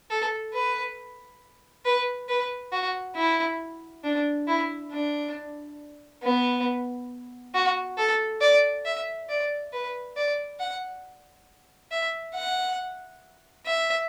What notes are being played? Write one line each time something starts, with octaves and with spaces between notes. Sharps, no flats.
A4
B4
B4
B4
F#4
E4
D4
E4
D4
B3
F#4
A4
D5
E5
D5
B4
D5
F#5
E5
F#5
E5